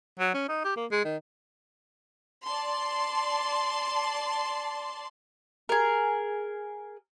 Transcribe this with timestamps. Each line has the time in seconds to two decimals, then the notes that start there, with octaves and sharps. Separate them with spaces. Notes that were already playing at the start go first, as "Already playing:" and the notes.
0.19 F#3
0.34 C#4
0.49 D#4
0.64 G4
0.76 A#3
0.91 G#3
1.05 D#3
2.46 D5 A5 C6
5.69 G#4 A#4